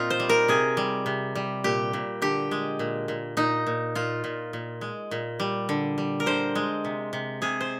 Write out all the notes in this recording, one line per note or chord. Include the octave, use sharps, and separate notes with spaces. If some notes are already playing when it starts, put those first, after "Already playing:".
Already playing: A#2 C4 D#4 F4
C5
G3
A#4
C3 G#4
G3
C3
G3
A#2 G4
A#2
D3 G4
G#3
A#2
A#2
A#2 D#4
A#2
A#2 F4
A#2
A#2
G#3
A#2
G3
D3
G3
A#4
D3 C5
G#3
C3
C3
C3 G#4
C5